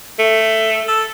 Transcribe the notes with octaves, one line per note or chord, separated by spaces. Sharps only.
A3
A4